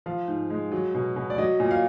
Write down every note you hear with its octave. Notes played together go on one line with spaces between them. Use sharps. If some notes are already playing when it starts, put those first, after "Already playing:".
F3 F5
G#2
G#3
F#3
B2
B2
D5
F#3 D#5
A#2
F5